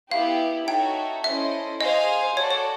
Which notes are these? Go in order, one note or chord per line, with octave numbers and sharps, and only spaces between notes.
B3 E4 G4 F5
D#4 F#4 A4 C#5 E5 G5
C#4 E4 A4 C5 D#5 E5
G#4 C5 D#5 F5 G#5
F#4 A4 C#5 D5
C#5